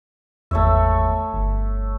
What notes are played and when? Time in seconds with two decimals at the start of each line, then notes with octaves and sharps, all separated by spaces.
0.51 G#1 E2 A3 C#5 E5
1.33 G1